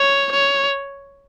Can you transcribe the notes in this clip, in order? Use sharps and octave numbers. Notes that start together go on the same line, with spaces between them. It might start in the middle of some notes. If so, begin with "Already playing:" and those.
Already playing: C#5
C#5